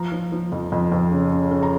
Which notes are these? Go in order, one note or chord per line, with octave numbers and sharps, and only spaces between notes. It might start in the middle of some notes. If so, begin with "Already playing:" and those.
Already playing: F3 A#5
F3
F3
F2
F2
F2
C#3
C#3
C#3
A#5